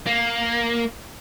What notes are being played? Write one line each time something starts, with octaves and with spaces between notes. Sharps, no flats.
A#3